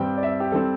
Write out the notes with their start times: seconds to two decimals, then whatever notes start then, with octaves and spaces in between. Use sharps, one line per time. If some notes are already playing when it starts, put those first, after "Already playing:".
Already playing: G2 G3 C4 G5
0.18 D5
0.23 E5
0.40 G4
0.52 G3 C4 A4